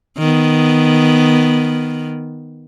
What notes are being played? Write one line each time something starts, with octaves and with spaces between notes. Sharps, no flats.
D#3 B3